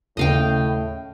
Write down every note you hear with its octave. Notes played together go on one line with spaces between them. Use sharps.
D#2 A2 C#3 D#5 F5 G5